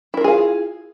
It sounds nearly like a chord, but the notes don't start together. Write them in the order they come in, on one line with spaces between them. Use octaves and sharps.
E4 A#4 F4 G#4 F5